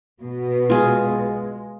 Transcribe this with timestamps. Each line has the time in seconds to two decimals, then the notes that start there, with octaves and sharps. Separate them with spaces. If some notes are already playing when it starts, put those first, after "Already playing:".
0.22 B2
0.70 G#3 F4 G#4